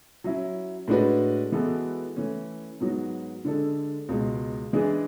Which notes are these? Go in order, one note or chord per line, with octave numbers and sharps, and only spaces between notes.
F#3 C#4 E4
A2 G#3 D4 F#4 B4
E3 G#3 B3 F#4 A4
E3 A3 C#4
G#2 F#3 B3 F#4
D3 G#3 D4 A4
C#2 B2 G#3
E3 G#3 D4 G#4